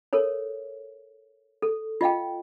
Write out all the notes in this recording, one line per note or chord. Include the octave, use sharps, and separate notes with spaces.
A4 A#4 C#5
A4
F4 D#5 F5 G5